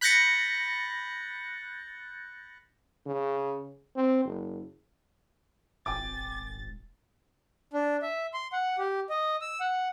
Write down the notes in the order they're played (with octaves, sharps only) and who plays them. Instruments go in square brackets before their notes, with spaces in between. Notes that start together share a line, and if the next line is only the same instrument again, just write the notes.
[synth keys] B5 F#6 G6 A6 A#6 C#7
[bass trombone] C#3
C4
F#1
[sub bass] D#1 [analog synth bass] G#1 [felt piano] G5 G#5 D6 [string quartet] A6
[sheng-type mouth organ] D4
E5
C6
F#5
G4
D#5
E6
F#5